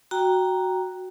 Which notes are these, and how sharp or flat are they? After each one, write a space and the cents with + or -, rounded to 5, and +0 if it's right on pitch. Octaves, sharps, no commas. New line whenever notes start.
F#4 +0 G5 +0 A#5 +0